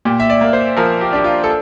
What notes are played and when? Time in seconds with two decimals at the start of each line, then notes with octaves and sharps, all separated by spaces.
0.05 A#2 G4
0.20 E5
0.30 D5
0.41 A#3
0.53 C5
0.77 F3 A#4
1.01 G4
1.13 D4 G4
1.24 F4
1.44 A4